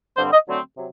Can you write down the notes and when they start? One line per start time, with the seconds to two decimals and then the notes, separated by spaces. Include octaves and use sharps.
0.17 G2 D3 G3 C4 C5
0.32 D#5
0.47 D3 F#3 A3 C4
0.76 C3 F#3